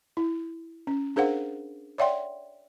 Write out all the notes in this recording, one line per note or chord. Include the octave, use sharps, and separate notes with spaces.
E4
C#4
D4 G#4 A#4 C5 F5 F#5
C#5 D5 E5 F#5 G5 C6